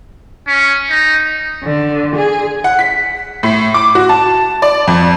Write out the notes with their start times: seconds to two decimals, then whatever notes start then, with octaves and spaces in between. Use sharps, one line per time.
0.48 C#4
0.90 D#4
1.64 D3
2.16 G#4
2.64 F#5
2.79 B6
3.43 A2
3.74 D6
3.95 F#4
4.09 A5
4.62 D5
4.87 F2